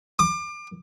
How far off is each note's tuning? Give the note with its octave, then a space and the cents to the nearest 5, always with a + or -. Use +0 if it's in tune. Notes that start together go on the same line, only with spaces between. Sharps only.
D6 +30